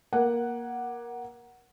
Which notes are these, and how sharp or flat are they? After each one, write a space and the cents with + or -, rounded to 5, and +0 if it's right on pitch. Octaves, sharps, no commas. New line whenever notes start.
A#3 +20 F#5 +0